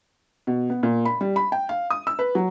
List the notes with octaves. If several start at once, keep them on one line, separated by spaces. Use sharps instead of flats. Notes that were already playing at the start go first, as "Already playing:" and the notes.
B2
B3
A#2
B5
G3
B5
G5
F5
D#6
E6
B4
F#3